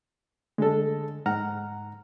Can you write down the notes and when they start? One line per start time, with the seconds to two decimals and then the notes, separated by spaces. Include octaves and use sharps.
0.58 D3 G#3 A4
1.26 G#2 F#5 A#5 F6